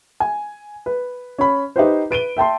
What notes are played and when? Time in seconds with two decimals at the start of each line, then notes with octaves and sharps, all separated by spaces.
0.20 G#5
0.86 B4
1.38 C#4 B5
1.76 D#4 G4 B4 C5
2.11 B4 D7 D#7 G7
2.37 E5 G5 A5 C6